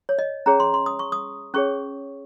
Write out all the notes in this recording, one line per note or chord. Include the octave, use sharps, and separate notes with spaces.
C#5
D#5
C#4 G#4 C#5 A#5
C6
C6
D#6
C#6
D#6
C#4 G#4 C#5 C#6